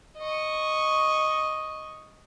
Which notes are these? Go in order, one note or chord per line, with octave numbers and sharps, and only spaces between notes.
D#5 C#6